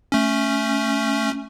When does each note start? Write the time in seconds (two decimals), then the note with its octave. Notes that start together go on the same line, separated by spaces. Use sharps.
0.12 A3 C#4